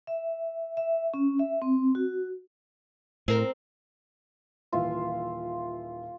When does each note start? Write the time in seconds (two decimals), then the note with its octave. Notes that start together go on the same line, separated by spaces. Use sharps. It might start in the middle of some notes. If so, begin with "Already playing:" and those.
0.07 E5
0.77 E5
1.14 C#4
1.39 E5
1.62 C4
1.95 F#4
3.28 A2 C4 A#4
4.72 D#1 E3 F4 E5